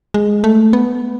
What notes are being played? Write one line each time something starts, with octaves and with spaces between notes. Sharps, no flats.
G#3
A3
B3